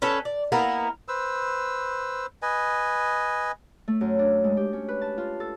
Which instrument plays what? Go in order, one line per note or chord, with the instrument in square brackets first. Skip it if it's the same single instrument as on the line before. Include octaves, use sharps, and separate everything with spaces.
[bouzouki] C#4 A4 B4
D5
A#3 B3 E4 A#4
[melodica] B4 C5 E6
B4 D#5 G#5
[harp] A3
F#2
D4
G#3
G4
C#4
B4
A5
F4
A4